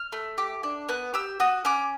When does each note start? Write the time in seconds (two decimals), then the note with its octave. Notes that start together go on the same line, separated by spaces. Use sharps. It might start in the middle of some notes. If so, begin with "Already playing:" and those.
Already playing: F6
0.12 A3
0.38 G4
0.63 D4
0.89 B3 F#6
1.14 G4 E6
1.40 F#4 D#6
1.65 C#4 D6